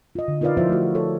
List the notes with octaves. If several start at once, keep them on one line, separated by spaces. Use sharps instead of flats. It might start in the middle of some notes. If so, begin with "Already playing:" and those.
F4 D#5
D3
D#4 F4 A#4 B4 D5 F5
F3 E4 F4 B4 C5 E5
A3 F#4
A4 C#5